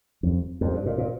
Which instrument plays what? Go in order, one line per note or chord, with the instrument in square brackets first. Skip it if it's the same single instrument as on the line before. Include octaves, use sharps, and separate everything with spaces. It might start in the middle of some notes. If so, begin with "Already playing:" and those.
[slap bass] F2
F2
G2
A#2
A#2